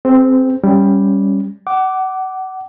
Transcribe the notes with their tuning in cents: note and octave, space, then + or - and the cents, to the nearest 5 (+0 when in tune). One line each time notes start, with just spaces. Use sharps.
C4 +0 G#4 +20 C5 -35
G3 +5 C#4 +0
F#5 +30 D6 -5